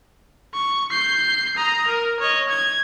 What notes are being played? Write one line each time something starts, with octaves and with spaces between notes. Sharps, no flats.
C#6
G6 C7
A#5 D#6
A#4
C#5 D#5
G#6